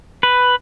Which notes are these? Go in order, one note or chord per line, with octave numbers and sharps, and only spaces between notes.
B4